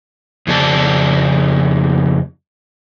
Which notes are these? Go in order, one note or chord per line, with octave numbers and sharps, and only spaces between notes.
F2 C#3 D5 A5